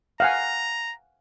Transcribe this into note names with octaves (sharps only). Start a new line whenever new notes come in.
F5 F#5 G#5 A#5